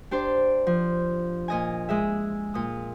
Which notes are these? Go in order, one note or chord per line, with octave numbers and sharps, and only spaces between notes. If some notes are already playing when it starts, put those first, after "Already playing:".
D4 G4 C5 D5
F3
A#2 D#5 G#5
G#3 G#4 E5
A#2 D#6